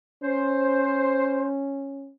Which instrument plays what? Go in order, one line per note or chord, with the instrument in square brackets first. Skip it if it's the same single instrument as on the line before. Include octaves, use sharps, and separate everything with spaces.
[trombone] C#4 [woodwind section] C5